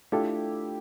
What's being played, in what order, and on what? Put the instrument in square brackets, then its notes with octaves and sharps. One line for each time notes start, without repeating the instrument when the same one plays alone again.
[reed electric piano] A3 D4 F4 A4 [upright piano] E4 G4